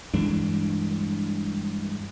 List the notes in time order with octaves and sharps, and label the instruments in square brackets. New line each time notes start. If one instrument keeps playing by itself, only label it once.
[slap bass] G2 E3 G#3 D4